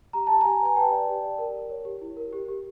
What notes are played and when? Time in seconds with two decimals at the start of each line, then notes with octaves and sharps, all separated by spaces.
0.13 G4 A#5
0.27 G4 A5
0.41 G4 G#5 A#5
0.61 B4 G#5
0.76 B4 G5 A5
0.92 D5
1.08 G4
1.23 D5
1.38 A#4
1.55 A#4
1.70 C#5
1.85 G4
2.01 E4
2.17 A#4
2.33 G4
2.48 G4